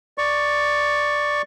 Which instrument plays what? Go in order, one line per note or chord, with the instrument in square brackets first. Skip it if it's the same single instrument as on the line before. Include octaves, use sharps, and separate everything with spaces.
[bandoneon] D5 C#6